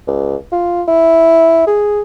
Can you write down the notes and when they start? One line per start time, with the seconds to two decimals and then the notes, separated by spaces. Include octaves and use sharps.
0.07 C#2
0.52 F4
0.88 E4
1.67 G#4